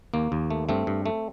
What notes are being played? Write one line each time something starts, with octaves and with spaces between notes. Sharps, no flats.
D#2 A#3
D#2
A3
G2 A3 C4
G2
A3